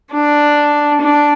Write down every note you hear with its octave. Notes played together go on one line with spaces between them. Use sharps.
D4
D4